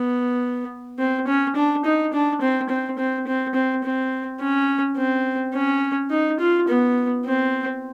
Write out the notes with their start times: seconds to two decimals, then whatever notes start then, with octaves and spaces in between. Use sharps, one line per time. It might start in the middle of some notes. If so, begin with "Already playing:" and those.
Already playing: B3
0.99 C4
1.27 C#4
1.56 D4
1.85 D#4
2.13 D4
2.41 C4
2.69 C4
2.98 C4
3.27 C4
3.54 C4
3.84 C4
4.40 C#4
4.97 C4
5.54 C#4
6.11 D#4
6.40 F4
6.68 B3
7.25 C4